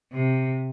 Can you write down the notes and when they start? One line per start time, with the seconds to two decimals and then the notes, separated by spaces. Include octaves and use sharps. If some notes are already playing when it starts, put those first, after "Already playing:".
0.12 C3